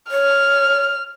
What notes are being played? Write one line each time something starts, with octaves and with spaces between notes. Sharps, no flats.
C#5 F6